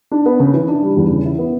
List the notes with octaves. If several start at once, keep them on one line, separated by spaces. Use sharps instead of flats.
D4
B3
C#3
E3
D4
G3
E2
C#3
E4
B3